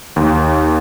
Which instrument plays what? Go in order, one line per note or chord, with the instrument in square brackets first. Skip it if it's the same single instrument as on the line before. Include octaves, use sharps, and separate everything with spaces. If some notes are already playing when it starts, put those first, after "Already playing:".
[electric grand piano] D#2